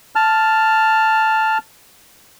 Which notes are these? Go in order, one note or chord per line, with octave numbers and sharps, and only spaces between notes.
A5 F6